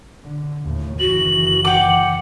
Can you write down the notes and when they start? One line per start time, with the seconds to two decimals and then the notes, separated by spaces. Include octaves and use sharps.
0.24 D3
0.62 D#2 A2
0.99 F#1 D#3 E3 F#4 F#7
1.65 F#5 G5 D6